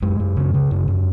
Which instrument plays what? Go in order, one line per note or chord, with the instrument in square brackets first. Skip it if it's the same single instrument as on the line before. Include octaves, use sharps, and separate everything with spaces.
[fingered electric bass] F#2 G#3
F#2
C#3
C#3
F#2
F#2